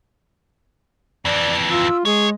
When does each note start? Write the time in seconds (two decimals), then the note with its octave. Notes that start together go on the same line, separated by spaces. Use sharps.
1.25 F2 E3 D5
1.70 F4 E6
2.05 G#3 G#4 C#5